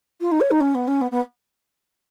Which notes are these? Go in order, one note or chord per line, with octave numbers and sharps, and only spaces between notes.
F4
D#4
C#5
D#4
C#4
B3
C#4
B3
B3